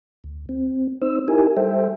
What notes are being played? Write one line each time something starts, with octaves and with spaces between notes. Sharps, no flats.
D2
C4
C4 D#4 C5 E6
D#4 E4 G4 A#4 G#5
G3 A4 C5 E5 G5